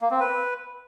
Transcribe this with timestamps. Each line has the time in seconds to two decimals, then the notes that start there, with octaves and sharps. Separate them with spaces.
0.01 A#3
0.11 C4
0.20 B4